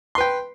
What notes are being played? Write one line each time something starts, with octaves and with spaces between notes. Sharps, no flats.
B4 G5 C6